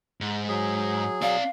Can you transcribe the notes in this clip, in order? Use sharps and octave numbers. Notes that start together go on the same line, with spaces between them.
G#2
F#3 G#4
C4 D5 F5